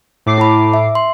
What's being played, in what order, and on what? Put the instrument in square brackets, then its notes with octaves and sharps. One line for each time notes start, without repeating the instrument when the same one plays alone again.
[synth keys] A2 D6 C7
[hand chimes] E4 A5 B5
E5
C6